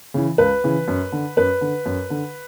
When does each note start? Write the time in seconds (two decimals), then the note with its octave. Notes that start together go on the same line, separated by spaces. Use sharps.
0.14 C#3 E3
0.38 C#2 B4
0.64 C#3 E3
0.88 F#2
1.12 D3
1.37 F#2 B4
1.61 D3
1.86 F#2
2.10 D3